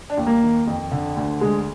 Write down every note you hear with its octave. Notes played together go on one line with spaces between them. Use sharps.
D4
D#2
A#3
D#3
F2
D3
D2
D3 G#3